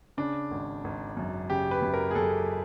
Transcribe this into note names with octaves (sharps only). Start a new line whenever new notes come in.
C#3 D4
G#1
G#1
F#2
C#3 G4
B4
F#2
A#4
G#4
F#2 A4